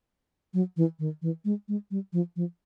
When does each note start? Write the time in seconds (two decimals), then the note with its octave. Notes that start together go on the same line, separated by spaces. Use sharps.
0.54 F#3
0.77 E3
0.99 D#3
1.22 E3
1.45 G#3
1.68 G#3
1.91 G3
2.13 F3
2.36 F3